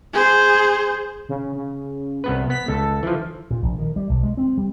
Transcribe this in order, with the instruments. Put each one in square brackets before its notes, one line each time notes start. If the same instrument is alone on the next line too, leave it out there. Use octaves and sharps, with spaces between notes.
[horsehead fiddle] G#4 C5
[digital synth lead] C#3
C#3
[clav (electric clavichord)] C2 B3 B4
[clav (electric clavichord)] B3 [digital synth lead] B6
[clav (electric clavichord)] C#2 [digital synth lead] A4
[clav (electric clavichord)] E3 F3
[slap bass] A#2
A#1
D#3
G3
B1
G#3
C4
G3